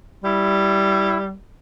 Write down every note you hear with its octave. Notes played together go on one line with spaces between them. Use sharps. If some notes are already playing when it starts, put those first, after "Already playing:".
G3 E4